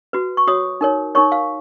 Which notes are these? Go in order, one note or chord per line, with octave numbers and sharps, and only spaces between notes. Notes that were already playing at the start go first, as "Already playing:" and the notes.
F#4 B4
C#6
F#4 C#5 D#6
D#4 A#4 C#5
D#4 A#4 C#5 C#6
F5